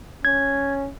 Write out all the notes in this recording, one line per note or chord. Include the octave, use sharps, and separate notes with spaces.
C#4 G#6